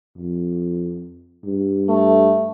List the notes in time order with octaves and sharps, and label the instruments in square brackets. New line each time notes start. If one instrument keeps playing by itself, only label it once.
[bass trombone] F2
G2
[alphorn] A3